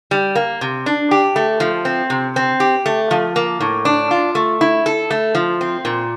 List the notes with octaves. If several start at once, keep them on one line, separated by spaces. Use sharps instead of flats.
G3
A#3
C3
D4
G4
A3
F3
C4
C3
C4
G4
A3
F3
A#3
A2
D4
F4
A3
E4
A4
A3
F3
C4
A#2